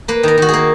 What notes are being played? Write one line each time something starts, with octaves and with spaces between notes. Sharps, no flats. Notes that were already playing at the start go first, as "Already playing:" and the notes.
A#3 B4
D#3 A#4
D#3 F#4
A#3 G#4